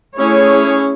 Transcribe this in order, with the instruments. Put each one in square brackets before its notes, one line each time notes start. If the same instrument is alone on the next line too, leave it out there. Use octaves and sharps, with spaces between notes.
[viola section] A3 E4 G#4 C#5 [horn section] C#4